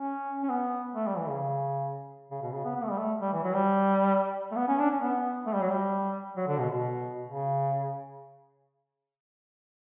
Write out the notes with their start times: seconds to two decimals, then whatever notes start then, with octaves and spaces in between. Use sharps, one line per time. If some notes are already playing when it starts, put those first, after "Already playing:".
Already playing: C#4
0.43 C#4
0.50 B3
0.96 A3
1.07 G3
1.18 E3
1.30 C#3
2.31 C#3
2.42 B2
2.53 C#3
2.65 B3
2.76 B3
2.83 A3
2.91 G3
2.98 A3
3.21 G3
3.33 E3
3.43 F#3
3.55 G3
4.52 A3
4.56 B3
4.68 C#4
4.79 D4
4.91 C#4
5.02 B3
5.46 A3
5.55 G3
5.63 F#3
5.70 G3
6.37 F#3
6.48 D3
6.59 B2
6.71 B2
7.28 C#3